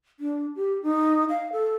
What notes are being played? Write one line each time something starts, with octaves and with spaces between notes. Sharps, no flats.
D4
G4
D#4
F5
A4